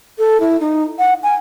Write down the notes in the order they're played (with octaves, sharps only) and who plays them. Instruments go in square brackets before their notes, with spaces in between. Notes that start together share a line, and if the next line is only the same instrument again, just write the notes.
[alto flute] A4
E4
D#4
F#5
G#5